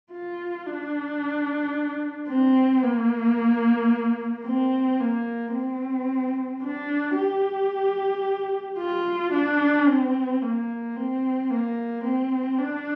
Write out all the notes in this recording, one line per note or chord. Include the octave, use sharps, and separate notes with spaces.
F4
D4
C4
A#3
C4
A#3
C4
D4
G4
F4
D4
C4
A#3
C4
A#3
C4
D4